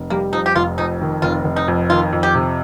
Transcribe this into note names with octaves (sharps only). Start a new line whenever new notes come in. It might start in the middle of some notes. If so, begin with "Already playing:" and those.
Already playing: F1
G3 A#3
F2 D#4
G4
F1 F4
F2 D#4
D#3
F1 F4
F1
D#4
F2
D#3 F4
F2
G4
C3